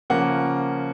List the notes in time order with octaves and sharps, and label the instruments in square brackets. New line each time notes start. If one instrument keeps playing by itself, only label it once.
[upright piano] C#3 F3 A#3 C#4 F#5